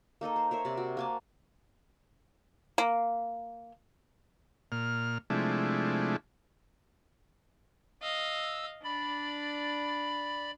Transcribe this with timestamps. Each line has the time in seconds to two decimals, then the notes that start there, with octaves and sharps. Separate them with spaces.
0.21 A#3 D#4 A4 D#5
0.36 C5
0.51 A#4 C5 C#5 E5
0.65 C3 D5
0.77 F#4
0.97 A#3 G#5 A5
2.78 A#3
4.72 A#2 F6
5.30 C3 F3 G#3 A3 D4 E4
8.02 D#5 F5 E6
8.84 D4 D5 B5